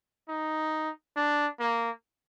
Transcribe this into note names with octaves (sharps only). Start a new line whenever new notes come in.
D#4
D4
A#3